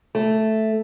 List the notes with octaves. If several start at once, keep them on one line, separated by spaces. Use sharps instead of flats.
A3